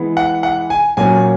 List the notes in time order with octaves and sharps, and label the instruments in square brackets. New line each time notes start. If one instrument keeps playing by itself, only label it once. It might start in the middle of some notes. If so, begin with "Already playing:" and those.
Already playing: [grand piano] E3 G#3 B3
F#5
F#5
G#5
A#2 F#3 A#3 C#4 G#5